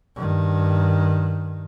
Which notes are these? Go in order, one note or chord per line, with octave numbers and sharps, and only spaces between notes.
G2 D#3